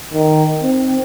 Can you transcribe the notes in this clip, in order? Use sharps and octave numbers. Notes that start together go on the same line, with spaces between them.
D#3
C4